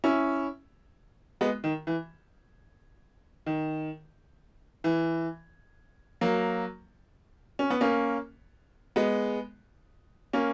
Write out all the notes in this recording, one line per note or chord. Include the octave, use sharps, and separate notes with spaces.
C#4 E4
G#3 B3
D#3
E3
D#3
E3
F#3 A#3
C#4
B3
A#3 C#4
G#3 B3
A#3 C#4